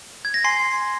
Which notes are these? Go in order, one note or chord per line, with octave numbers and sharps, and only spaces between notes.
G#6
A#6
G#5 C6 C7